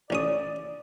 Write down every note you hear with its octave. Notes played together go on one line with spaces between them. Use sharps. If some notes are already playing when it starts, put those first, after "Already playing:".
A1 C#4 D5 D#6